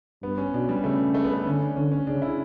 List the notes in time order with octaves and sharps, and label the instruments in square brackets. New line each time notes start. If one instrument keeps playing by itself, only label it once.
[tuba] G2 [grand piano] B3
[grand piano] C#4
[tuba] B2 [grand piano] D4
[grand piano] G3
[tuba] C#3 [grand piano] A3
[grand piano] A3
B3
A3
[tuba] D3 [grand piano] C#4
[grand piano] D4
[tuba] D3 [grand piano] C#4
[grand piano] C#4
[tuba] C#3 [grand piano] D4
[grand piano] E4